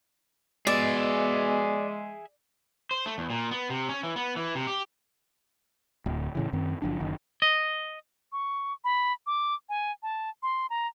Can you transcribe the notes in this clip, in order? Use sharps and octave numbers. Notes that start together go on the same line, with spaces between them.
B2 G#3 G#4 D5 E5
C5
A3
E2
A#2
B3
C3
C#4
E3
B3
E3
C3
G4
D1 D2
A2 C#3 E3
F#2 D#3 C4
F#1 F3 D4
F#1 D#3
D#5
C#6
B5
D6
G#5
A5
C6
A#5